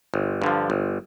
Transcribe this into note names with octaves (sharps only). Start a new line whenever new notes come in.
G1
G2 D3 F3
G1